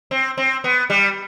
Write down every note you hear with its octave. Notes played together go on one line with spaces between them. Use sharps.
C4
C4
B3
G3